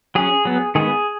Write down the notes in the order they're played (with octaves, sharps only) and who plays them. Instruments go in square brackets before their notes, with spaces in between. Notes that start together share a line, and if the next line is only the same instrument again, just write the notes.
[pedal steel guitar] F#3 C#4 G#4
F#3 B3
D#3 G#3 B3 G#4